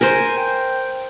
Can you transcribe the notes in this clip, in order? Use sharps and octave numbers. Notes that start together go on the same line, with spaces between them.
A#4 C5 G#5
G5